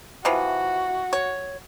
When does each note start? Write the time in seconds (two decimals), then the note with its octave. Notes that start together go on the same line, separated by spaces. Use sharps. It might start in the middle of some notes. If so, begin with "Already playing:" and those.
0.25 C3 E3 F3 F#4
1.13 C#5